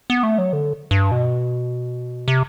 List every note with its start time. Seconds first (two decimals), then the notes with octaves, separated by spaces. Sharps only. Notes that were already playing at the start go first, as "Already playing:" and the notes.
0.10 B3
0.23 A3
0.38 F#3
0.53 D3
0.91 G2
1.12 B2
2.28 C3